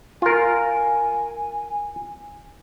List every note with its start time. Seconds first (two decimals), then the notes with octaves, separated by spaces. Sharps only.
0.22 F4 A#4 G#5